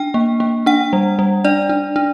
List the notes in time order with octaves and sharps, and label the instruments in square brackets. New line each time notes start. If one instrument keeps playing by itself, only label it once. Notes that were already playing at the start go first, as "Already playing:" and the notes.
Already playing: [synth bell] D4 G5
A#3
A#3
D4 F#5
G3
G3
D4 D5
D4
D4